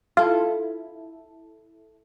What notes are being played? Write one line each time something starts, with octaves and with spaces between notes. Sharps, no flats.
E4 F4 A4